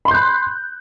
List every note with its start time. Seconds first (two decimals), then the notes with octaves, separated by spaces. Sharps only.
0.05 B5
0.08 C6
0.11 G6
0.14 F#6